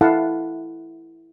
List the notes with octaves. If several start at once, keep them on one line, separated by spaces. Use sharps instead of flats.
E4 A4 F5 F#5 A5